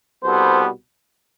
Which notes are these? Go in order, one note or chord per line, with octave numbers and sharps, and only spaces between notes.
C2 B2 G3 B3 A4 C5